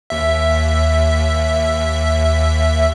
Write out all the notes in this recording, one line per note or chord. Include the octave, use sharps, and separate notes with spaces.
D#2 E5